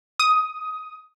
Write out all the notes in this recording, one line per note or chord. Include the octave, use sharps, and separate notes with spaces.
D#6